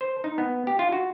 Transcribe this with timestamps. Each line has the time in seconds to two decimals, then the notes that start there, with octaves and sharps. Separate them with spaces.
0.01 C5
0.24 D#4
0.38 B3
0.67 G4
0.79 F4
0.92 F#4